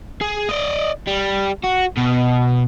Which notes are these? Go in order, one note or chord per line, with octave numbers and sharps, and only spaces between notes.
G#4
D5 D#5
G3
F#4
B2